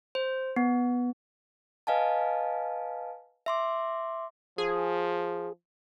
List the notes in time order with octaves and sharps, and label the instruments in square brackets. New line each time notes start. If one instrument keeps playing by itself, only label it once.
[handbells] C5
B3
[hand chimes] B4 D#5 F5 G#5 A5
E5 C6 D6
[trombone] F3 [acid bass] G#4